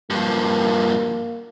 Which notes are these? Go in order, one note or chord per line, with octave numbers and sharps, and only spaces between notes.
G2 F3 A#3